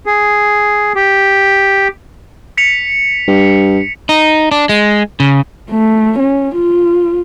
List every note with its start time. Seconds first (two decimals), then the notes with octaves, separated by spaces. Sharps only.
0.06 G#4
0.95 G4
2.57 B6 C#7 F7
3.28 G2
4.09 D#4
4.51 D4
4.69 G#3
5.20 C#3
5.70 A3
6.19 C#4
6.55 F4